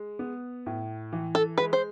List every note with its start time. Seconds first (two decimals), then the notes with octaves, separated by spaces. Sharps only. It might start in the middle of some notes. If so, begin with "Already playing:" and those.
Already playing: G#3
0.19 B3
0.66 A2
1.13 E3
1.35 A4
1.58 G#3 B4
1.73 C5